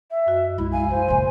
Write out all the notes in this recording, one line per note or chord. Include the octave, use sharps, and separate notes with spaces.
E5
F#2 F#4 D#5
B1 G#3 E4 B5
F5 G#5
B1 C5
C#2 A#2 C6